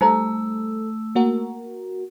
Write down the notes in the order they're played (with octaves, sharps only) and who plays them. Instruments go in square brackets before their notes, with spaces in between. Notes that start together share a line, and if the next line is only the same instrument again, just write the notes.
[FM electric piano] G3 A4 [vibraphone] A3 E6 [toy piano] D#4 C5 A#5
[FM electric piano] A#3 F#4 A#4